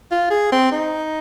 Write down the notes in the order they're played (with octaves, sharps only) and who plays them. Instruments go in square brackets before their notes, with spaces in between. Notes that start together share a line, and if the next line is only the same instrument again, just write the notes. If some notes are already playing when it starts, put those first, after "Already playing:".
[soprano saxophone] F4
G#4
C4
D#4